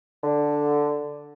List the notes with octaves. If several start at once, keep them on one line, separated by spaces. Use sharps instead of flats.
D3